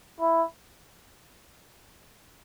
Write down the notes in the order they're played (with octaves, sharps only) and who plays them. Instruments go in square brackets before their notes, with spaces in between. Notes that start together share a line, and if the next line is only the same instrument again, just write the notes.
[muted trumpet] E4